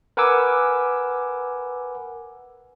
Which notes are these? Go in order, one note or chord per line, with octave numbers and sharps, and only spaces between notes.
A#4 B4 F#5 G#5 D6 E6